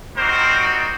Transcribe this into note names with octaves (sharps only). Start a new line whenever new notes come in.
G3 C4 D#4 F#4 A#4 C5